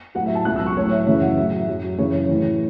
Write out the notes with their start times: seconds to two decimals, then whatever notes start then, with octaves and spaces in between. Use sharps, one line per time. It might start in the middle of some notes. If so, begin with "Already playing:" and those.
0.15 F#3 F#5
0.19 A2
0.26 E5
0.35 A5
0.45 C#2 B2 F#3 F#6
0.56 E6
0.66 C#6
0.76 A2 F#3 C#5
0.91 E5
1.07 F#2 C#3 E3 E5
1.22 F#5
1.37 A2 F#3 E5
1.67 F#2 F#3
1.98 F#2 C#3 E3 C#5
2.28 A2 E3